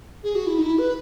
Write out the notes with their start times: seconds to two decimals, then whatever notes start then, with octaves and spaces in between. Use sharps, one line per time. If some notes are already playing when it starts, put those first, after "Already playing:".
0.24 G#4
0.35 F#4
0.47 E4
0.58 D#4
0.63 E4
0.78 B4